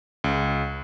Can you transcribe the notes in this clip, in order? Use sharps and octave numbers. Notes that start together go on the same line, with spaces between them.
C#2